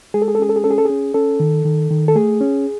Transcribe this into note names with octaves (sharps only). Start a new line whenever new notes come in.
G#3 G#4
A4
G#4
A4
C#4 G#4
A4
G#4
C#4 A4
G#4
A4
C#4 G#4
C#4 A4
D#3
D#3
D#3
A4
A3 G#4
C#4